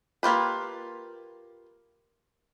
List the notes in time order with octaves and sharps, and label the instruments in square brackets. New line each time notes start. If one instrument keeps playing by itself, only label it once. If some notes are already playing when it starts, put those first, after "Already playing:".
[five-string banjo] A#3 F4 G4 B4